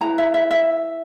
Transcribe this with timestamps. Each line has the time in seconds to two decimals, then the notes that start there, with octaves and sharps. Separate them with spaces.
0.01 E4 B4 A#5
0.18 E5
0.34 E5
0.51 E5